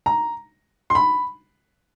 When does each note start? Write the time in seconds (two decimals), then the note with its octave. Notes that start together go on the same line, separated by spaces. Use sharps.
0.06 A#5
0.90 C6
0.95 B5